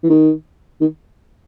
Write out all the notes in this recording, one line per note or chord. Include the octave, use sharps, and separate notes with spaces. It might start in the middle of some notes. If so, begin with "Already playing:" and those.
E3
D#3
D#3